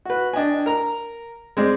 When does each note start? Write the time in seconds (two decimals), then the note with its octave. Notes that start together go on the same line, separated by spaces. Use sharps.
0.05 F#4 B4
0.33 D4 D#5 G5 G#5
0.66 A#4 A#5
1.57 G#3 C4 D5